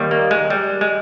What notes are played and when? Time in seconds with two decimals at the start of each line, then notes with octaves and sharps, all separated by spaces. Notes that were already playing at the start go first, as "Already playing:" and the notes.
Already playing: D#2 D#3 G3
0.11 A#3
0.31 G#3
0.50 G3
0.81 G#3